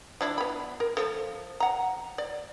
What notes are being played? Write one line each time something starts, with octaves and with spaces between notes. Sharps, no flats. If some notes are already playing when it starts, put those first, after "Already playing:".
F3 D4 E4
B3 B5
A#4
F3 A4
F#5 A#5
D5